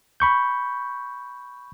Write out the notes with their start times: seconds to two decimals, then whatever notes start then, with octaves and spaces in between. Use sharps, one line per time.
0.20 B5 C#6 G6